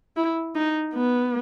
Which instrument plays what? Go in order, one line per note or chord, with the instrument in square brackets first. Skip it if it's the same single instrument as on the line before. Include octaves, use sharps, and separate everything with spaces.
[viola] E4
D#4
B3